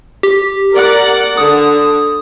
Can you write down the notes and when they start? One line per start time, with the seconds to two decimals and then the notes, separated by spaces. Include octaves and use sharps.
0.23 G4
0.73 A#4 D5 F#5
1.37 D3 D#6